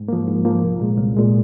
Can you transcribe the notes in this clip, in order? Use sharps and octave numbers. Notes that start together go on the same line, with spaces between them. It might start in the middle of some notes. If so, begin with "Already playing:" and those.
Already playing: G#2
F3 A#3
G#2
F3 A#3
C2
A#2 G#3
C2
A#2 G#3